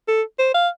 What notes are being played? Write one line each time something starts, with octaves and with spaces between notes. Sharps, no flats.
A4
C5
F5